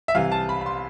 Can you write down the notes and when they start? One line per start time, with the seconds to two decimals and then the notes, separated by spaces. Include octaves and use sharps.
0.08 E5
0.15 C2 C3 E3 F5
0.32 A5
0.49 B5
0.61 B5
0.66 C6